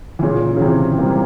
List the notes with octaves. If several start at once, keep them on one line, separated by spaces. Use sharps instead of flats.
E3
A#2 C#3
C#3
C3 E3
C4
G3 A#3